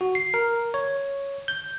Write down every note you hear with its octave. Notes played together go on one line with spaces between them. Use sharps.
F#4
C7
A#4
C#5
G6